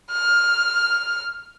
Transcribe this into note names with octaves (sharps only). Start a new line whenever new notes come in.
F6